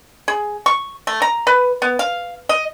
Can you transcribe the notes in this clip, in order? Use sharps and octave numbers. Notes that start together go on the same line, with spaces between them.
G#4
C#6
A3
A#5
B4
B3
F5
D#5